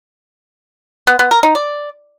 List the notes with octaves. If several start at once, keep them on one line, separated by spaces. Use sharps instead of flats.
B3
B3
A#4
D#4
D5